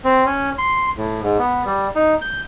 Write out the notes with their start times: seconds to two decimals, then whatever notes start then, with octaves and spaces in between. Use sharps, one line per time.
0.04 C4
0.26 C#4
0.58 C6
0.97 A2
1.23 G#2
1.39 B3
1.66 G3
1.95 D#4
2.21 G6